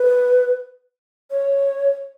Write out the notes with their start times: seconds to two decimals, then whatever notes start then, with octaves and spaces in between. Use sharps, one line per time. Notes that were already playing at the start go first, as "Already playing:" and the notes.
Already playing: B4
1.31 C#5